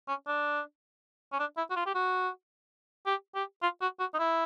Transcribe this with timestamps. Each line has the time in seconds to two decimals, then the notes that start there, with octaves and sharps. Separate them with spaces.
0.08 C#4
0.27 D4
1.32 C#4
1.39 D4
1.57 E4
1.70 F#4
1.76 F4
1.86 G4
1.95 F#4
3.06 G4
3.35 G4
3.62 F4
3.81 F#4
3.99 F#4
4.14 D#4
4.19 E4